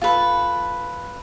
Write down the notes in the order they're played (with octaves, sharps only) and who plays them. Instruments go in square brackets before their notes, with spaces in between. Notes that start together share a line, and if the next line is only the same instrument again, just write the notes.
[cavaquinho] F4 A4 B4